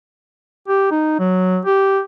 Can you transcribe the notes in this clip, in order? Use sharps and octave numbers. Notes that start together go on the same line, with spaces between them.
G4
D#4
F#3
G4